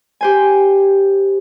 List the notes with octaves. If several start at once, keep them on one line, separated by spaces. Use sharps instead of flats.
G4 C5 G#5